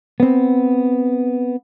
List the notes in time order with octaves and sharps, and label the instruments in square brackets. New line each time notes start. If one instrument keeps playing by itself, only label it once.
[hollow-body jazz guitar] B3 C4